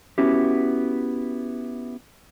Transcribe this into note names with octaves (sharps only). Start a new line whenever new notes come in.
B3 C#4 E4 F#4 G4